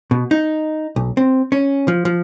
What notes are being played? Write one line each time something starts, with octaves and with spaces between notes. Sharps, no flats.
B2
D#4
B1
C4
C#4
F3
F3